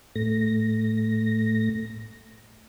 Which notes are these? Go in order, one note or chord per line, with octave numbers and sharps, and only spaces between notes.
A2 A3 A#6